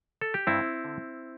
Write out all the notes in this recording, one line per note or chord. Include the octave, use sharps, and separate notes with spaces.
A4
G4
G2 C4 E4
D3